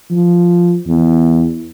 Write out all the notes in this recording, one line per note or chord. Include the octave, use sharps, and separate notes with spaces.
F3
E2